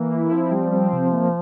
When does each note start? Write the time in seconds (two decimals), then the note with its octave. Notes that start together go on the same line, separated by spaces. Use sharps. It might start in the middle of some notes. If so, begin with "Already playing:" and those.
Already playing: E3 A#3
0.12 E4
0.32 F3 C4
0.51 G3
0.72 C4
0.92 C3
1.12 A#3